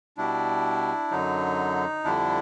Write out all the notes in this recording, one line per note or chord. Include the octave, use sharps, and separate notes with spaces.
B2 G3 D4 E4
F#2 D3 F#3 D#4
F2 D3 G3 D4 E4